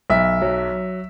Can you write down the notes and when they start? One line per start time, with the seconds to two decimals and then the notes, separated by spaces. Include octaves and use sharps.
0.10 B1 E5
0.42 F#3